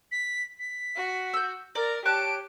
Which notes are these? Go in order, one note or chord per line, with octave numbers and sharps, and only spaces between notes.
B6
B6
F#4
E6 G6
A#4 D5 A#5
G4 C#5 A5 F#6 D7